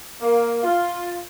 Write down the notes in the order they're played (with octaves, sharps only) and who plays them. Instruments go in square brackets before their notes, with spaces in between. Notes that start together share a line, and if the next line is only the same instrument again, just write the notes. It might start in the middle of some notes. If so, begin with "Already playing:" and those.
[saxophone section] A#3
F4